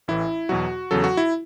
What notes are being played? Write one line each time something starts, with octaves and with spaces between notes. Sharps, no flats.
A1 A2 E3 E4
E2 B2 F#3 F#4
E2 C#3 F#3 A4
F#4
E4